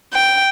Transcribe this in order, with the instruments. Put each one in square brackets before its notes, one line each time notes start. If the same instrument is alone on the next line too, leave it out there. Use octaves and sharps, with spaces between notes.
[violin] G5